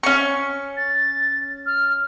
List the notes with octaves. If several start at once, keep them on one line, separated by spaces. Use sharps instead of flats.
C#4 C#6
A6
F6